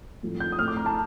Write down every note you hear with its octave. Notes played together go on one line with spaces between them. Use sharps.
A2 F3 A3 C4
G6
D#6
A2 A3 C4 F6
D6
A#5
A5